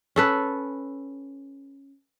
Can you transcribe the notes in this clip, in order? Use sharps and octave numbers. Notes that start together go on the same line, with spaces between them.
C#4 A4 B4